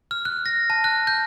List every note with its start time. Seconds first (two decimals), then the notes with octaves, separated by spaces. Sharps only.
0.11 F6
0.25 F#6
0.46 A#6
0.70 A5
0.84 F#6
1.07 G6